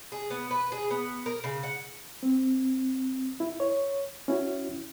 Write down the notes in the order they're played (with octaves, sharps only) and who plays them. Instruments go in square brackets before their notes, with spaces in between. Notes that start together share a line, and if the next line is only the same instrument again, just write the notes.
[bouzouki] G#4
B3
B4
G#4
B3
A#4
C#3
F#5
[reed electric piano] C4
E4
C#5
C#4 E4 F#4